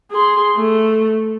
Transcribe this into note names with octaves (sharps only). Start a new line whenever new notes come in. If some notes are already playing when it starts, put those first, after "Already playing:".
G#4 C6
A3